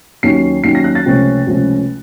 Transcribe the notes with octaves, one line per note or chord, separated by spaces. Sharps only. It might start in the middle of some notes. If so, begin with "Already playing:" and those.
D#2 D#3 F#3 A#3 C#4 C7
D#2 D#3 F#3 A#3 C#4 C7
A#6
F#6
A6
C#2 C3 F3 A3 C#4
C#2 C3 F3 A3 C#4